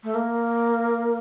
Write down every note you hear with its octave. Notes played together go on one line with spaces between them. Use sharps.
A3
A#3